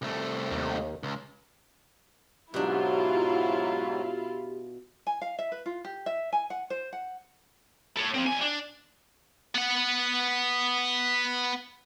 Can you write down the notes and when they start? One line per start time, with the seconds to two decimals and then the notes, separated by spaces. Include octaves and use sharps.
0.02 C2 A3
0.51 D#2
1.03 C#2
2.54 G#2 B2 F#3 D4 E4 F4 G4
5.07 G#5
5.22 F5
5.39 E5
5.52 B4
5.66 F4
5.85 G4
6.06 E5
6.33 G#5
6.50 F#5
6.70 C5
6.93 F#5
7.97 A4 C#5
8.14 C4 F4
8.27 G3 G#5
8.41 D4
9.55 B3 F#5